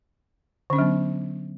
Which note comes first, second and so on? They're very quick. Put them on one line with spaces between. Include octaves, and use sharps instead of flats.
D3 C#4 D4 F#3 B3